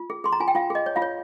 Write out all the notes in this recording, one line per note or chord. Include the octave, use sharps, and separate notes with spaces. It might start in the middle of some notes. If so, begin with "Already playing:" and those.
Already playing: F4
G#4
G#4 C6
A#5
F4 G#5
G5
F4 F5
G#4 D#5
C#5
F4 F5
C#5